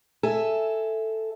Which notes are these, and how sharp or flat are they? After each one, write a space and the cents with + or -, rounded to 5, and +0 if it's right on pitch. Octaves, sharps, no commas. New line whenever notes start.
A4 +5 E5 +0 G#5 +0